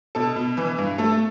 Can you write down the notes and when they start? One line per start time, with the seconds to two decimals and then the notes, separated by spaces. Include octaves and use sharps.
0.15 B2 A4
0.36 B2
0.57 E3 B4
0.79 G2
0.98 A3 A4